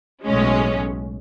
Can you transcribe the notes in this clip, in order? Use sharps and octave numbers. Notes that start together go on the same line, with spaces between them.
B1 A2 G#3 C#4